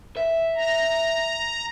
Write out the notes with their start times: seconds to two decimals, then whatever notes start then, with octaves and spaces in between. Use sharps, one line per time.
0.17 E5
0.56 A#5